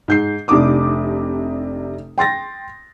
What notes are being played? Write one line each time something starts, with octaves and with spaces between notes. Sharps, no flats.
G#2 G6 C7
F1 C3 D4 D#4 D6 D#6
G5 C6 A6 A#6